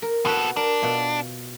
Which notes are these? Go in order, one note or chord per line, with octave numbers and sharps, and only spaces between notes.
A#4
B2 F#4 A4 B4
D4 A#4
B2 F4